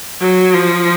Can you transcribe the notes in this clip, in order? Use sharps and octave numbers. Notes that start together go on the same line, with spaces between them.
F#3
F3